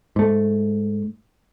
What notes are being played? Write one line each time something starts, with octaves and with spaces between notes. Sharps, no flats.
G#2 A3